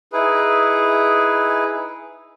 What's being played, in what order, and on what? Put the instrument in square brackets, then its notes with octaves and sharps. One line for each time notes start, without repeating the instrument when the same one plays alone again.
[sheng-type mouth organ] D#4 E4 G#4 B4